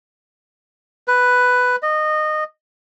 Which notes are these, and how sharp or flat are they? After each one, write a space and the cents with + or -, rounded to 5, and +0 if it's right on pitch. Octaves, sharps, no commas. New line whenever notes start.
B4 +5
D#5 -20